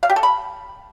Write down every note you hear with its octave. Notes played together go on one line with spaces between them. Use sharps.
F5
G4
A4
B5